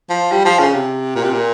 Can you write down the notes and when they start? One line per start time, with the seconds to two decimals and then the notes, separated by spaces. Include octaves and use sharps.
0.10 F3
0.32 G3
0.45 F3
0.59 C#3
0.74 C3
1.15 A#2
1.24 C3
1.33 A#2